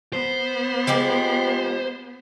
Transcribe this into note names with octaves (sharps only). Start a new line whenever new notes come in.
B3 C5
F3 G#3 G4